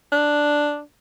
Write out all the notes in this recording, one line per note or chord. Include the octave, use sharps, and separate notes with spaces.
D4